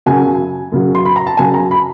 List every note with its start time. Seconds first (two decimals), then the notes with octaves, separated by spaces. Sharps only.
0.06 F#2 C#3 F#3 G#5
0.72 F#2 C#3 F#3
0.95 C6
1.05 B5
1.16 A#5
1.27 A5
1.37 F#2 C#3 F#3 G#5
1.54 A#5
1.71 B5